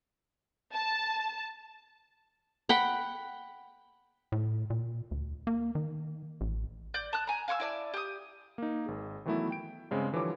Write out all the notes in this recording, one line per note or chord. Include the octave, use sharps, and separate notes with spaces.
A5
F#5 G5 B5
A2
A#2
D2
A#3
D#3
A1
D5 G6
A5 D#6 F#6
G#5 A#5
F5 G#5 C#6 E6
E4 D5 A5
G4 D#6
A#3 D#4
G#1 G#4
D#3 E3 F#3 A3 B3 E4
G5 D7
G2 C#3 G#3 C4
D3 E3 F3 G3 C#5 D6